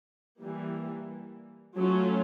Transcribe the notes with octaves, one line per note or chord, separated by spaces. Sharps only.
E3 G3 A#3
F#3 A3 C#4 F4